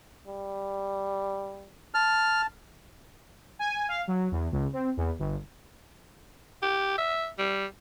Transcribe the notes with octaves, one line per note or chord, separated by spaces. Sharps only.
G3
A5 F6
G#5
F5
F#3
E2
C#2
C4
E2
G1
G4
E5
G3